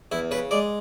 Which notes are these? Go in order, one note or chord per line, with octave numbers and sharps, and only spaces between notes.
E2 E4
C#3 B4
G#3 D5